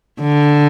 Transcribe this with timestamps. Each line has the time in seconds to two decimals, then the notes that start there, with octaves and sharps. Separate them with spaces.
0.21 D3